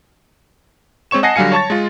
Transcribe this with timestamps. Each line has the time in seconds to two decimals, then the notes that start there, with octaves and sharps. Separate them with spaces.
1.11 G#3 C4 C#5 C#6 E7
1.23 D#5 F#5 G#5 A5 A#6 C7
1.36 D3 F#3 G3 F5 G#5 C#7
1.52 C#5 A5 C#6 A6
1.70 G#3 F4